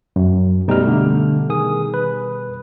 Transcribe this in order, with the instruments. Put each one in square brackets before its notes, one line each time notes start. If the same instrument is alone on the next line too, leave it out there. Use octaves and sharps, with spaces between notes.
[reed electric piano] F#2
[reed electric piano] B2 G3 F6 [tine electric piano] A3 D#4
[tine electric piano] D3 A3
D#3 G#4 D#6
B4